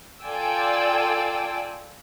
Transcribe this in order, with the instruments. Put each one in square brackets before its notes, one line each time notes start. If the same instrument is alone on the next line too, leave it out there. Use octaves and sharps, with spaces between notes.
[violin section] F4 A4 D5 G5 G#5 E6